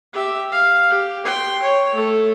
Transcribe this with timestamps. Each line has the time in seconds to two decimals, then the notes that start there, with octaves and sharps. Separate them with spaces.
0.13 G4 E5
0.52 F5
0.90 G4
1.25 G5 C6
1.63 C#5
1.94 A3 A4